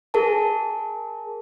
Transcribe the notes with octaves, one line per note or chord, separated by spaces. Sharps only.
G#4 A#4 A5